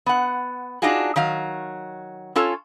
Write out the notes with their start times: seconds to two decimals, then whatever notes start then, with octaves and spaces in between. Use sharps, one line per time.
0.06 B3 F#5
0.82 D4 D#4 F4 F#4 G#4
1.16 D#3 F#3 F5
2.36 C#4 F4 A4 C#5